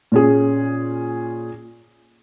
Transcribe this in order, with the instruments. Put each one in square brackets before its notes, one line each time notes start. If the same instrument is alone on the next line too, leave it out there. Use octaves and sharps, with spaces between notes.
[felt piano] A#2 C#4 G#4